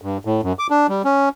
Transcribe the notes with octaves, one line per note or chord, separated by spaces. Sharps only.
G2
A2
F#2
D6
D4
G3
C#4